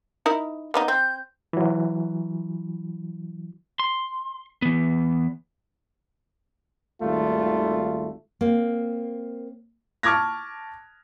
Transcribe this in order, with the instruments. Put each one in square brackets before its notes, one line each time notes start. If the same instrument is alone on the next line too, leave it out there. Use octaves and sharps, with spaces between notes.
[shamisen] D#4 E4 A#4
A#3 B3 D#4
[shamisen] C4 [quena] G6
[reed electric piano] E3 F#3
[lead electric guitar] C6
E3 B3
[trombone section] G#1 D#2 G3 A3 F4
[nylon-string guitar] A#3 C4
[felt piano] A5 C#6 D6 F6 G#6 A#6